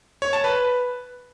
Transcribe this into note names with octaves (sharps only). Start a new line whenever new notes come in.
C#5
A5
B4